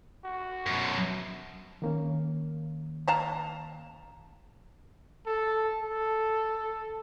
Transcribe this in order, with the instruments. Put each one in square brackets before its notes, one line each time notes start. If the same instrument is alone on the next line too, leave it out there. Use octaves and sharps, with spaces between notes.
[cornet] F#4
[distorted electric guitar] F#2 B2
[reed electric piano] D#3 A#3 C#4
[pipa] F5 A5 A#5
[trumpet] A4
A4